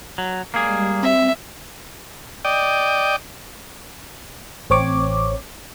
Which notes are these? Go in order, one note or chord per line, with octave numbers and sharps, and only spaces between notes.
F#3
G3 G#3 A#3 G#4
C4 E5
D5 D#5 G5
A1 C4 C#5 D6